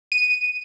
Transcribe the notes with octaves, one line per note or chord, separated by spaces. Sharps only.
D#7